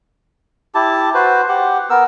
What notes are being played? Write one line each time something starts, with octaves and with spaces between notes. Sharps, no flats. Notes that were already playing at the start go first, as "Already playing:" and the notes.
E4 G4 A5
F#4 B4 C5
G4 F#5
B3 A#4 E6